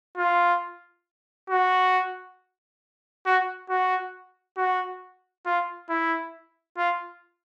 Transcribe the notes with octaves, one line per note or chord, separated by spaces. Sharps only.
F4
F#4
F#4
F#4
F#4
F4
E4
F4